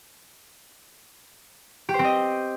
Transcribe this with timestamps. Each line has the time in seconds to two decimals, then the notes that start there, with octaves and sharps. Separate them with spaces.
1.89 G4
1.94 C5
1.99 C4
2.04 D#5